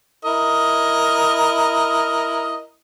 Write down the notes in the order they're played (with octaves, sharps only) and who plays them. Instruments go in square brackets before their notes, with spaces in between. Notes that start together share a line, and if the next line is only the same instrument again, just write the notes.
[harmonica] E4 A#4 D#5